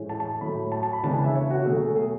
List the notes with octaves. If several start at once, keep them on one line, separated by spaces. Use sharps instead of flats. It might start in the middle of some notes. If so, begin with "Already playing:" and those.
Already playing: A2 E3 G#3 C#4
A5
A5
A2 F#3 A3 B5
A5
A5
B5
C#3 E3 G#3 B3 D4 A5
G#5
E5
C#5
F#4
B2 F#3 A3 G#4
G#4
A4
G#4